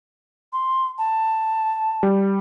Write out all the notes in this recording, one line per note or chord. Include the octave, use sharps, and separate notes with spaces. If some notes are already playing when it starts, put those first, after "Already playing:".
C6
A5
G3